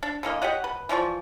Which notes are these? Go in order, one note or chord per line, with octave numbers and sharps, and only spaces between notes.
D4
D3 E3 A#3 D#5
G4 C#5 D#5 F#5
B4
E3 F3 D5 C#6